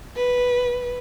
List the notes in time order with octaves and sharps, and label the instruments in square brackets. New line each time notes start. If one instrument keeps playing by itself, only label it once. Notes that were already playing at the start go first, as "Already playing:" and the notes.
[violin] B4